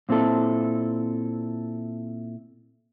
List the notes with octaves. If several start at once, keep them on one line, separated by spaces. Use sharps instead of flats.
A#2 C4 E4 A4